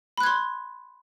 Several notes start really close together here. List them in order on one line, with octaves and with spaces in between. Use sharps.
B5 F#6 G#6 C6